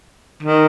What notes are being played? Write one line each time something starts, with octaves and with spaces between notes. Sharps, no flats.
D#3